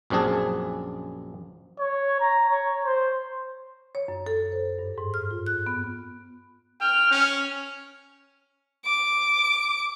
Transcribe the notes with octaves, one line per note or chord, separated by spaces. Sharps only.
A#1 F#2 C4 D4 G#4 A5
C#5
A#5
C#5
C5
C#5
F#2
A4
C5
G2
G#2
F6
F4
F#6
B3
G5 F6
C#4
D6